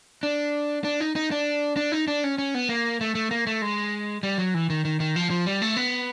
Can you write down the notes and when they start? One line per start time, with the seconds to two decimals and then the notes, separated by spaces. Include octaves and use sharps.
0.23 D4
0.84 D4
1.00 D#4
1.16 D#4
1.31 D4
1.77 D4
1.92 D#4
2.08 D4
2.24 C#4
2.38 C#4
2.55 B3
2.69 A#3
3.01 A3
3.15 A3
3.31 A#3
3.47 A3
3.62 G#3
4.23 G3
4.38 F#3
4.54 E3
4.70 D#3
4.85 D#3
5.00 D#3
5.16 F3
5.30 F3
5.46 G3
5.62 A3
5.77 B3